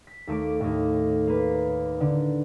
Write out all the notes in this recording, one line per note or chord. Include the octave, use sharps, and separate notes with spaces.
B6
D#2 A3 D6 D7
D#2 A2
A#3 B4
D3